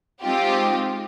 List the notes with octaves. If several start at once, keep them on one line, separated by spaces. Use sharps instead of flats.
G#3 C4 D#4 F4 G4